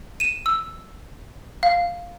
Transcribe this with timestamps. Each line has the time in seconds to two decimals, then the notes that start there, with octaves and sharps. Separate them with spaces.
0.20 D#7 E7
0.46 E6
1.63 F5